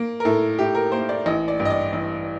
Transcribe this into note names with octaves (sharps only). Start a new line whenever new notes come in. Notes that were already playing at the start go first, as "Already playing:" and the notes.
Already playing: A#3
A#4
A2 A4
A2 G4
A#4
A#3 C5
D5
A1 D#5
D5
G2
D#5
D5
A1